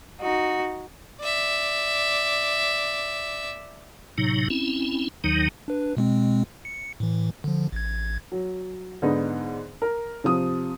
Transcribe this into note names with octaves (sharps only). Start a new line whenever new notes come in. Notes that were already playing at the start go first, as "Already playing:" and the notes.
D#4 F#4
D5 E5
A2 C3 F#3 D#4
C4 C#4 E4
D#2 D#3 F#3 D#4
D4 B4
B2 G#3 C4
C#7
A2 E3
D3 F3
A1 G#6
F#3
G#2 D3 B3 D#4
A#4
C3 F3 D#6